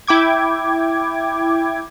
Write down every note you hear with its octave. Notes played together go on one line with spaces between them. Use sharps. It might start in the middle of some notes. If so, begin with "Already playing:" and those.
E4 G5 D6 G#6